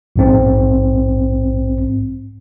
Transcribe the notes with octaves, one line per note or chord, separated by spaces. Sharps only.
A#1 G#2 C4